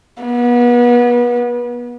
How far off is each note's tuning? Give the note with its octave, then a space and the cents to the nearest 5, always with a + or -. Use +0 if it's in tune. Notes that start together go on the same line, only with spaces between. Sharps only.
B3 -30